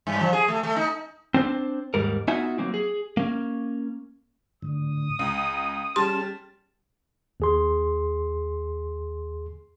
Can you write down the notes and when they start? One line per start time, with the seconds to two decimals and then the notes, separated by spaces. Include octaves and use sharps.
0.07 G2
0.20 F3
0.33 G#4
0.48 A3
0.63 A3
0.76 D#4
1.34 C4 D4 C5
1.94 D#2 G#2 G3 A#4
2.28 B3 D#4 F4 F#4 E5 G#5
2.58 F#3 A#3 C4
2.74 G#4
3.17 A#3 C#4
4.62 A2 D3 D#6
5.19 C#2 A#5
5.96 G3 C#4 G#4 A5 C6 F6
7.40 D#2 G#4 C6